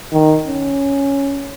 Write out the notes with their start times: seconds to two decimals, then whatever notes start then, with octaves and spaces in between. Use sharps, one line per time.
0.13 D#3
0.47 C#4